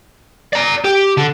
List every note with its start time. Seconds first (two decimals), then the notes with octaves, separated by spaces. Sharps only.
0.53 D5 A#5
0.84 G4
1.17 D3